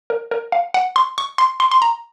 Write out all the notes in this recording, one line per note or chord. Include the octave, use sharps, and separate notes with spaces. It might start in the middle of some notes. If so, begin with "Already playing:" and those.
A#4
A#4
F5
F#5
C6
C#6
C6
C6
C6
A#5